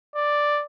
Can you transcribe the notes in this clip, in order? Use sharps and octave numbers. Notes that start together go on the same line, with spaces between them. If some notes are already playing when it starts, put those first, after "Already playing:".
D5